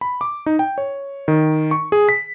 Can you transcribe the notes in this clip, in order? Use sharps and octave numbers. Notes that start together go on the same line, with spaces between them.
B5
D6
D#4
G5
C#5
D#3
C#6
G#4
B6